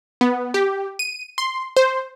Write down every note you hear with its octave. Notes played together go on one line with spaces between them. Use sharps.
B3
G4
D#7
C6
C5